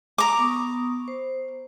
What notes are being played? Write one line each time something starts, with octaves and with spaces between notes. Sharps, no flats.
A#5 D6
B3 C#6 D#6
C5